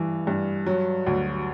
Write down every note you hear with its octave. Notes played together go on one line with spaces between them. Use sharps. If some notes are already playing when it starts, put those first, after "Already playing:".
Already playing: G2 E3
G2
F#3
D2